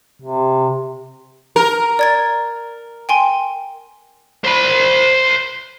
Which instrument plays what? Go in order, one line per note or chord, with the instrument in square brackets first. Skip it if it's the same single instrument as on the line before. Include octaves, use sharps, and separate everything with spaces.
[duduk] C3
[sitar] A#4
[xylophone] D5 G#6 A6
G5 G#5 C6
[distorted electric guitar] C5 B5